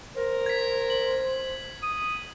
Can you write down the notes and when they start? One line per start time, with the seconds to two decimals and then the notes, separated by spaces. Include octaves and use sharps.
0.17 A#4 C5
0.46 G#6 B6
0.90 F#7
1.83 D#6